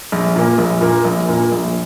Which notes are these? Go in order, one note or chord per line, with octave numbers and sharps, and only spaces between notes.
A#1
A#2 A#3
A#1
A#2 A#3
A#1
A#2 A#3
A#1